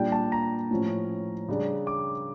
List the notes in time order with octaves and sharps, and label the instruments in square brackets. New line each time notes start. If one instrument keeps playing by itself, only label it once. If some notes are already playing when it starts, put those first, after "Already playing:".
Already playing: [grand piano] A#2 G3 D4 G5
A5
A#5
A2 F3 C#4
C#3 G3 D4
D6